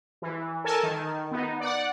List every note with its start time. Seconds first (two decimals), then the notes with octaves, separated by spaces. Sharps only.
0.22 E3
0.64 A4 A#4 G#5 A5
0.83 D#3
1.31 B3 D#4
1.60 D5 F#5